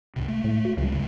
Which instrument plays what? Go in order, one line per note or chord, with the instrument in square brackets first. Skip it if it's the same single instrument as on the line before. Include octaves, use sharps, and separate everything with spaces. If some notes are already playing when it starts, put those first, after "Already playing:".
[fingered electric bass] C#2 G#2 C3
G#3 A3
[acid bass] A2
F#4
[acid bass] C#2 [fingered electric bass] C#3 F#3 G3
[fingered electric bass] G2 C#3 G#3